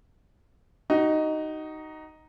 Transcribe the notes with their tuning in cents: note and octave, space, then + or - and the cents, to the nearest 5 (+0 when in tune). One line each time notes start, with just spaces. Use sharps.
D#4 +0 F#4 +35